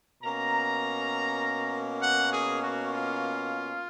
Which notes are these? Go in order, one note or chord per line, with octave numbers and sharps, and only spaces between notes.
B2 A#3 C#4 A#5
F#5
G#4
F#4
F4